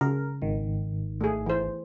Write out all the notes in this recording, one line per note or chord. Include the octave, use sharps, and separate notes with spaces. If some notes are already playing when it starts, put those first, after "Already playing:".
C#3 A#4
G#1 D#3
A3 G#4
E3 C5